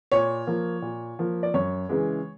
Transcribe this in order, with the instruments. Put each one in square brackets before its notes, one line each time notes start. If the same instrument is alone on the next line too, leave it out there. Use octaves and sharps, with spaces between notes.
[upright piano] A#2 C#5
F3 A#3
A#2
F3 A#3
D5
F#2 C#5
C#3 E3 G#3